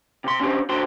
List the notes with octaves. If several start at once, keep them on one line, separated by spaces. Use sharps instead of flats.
C3 C6
C#4 D4 F4 G4 C5
D4 F#4 C5 G5 C6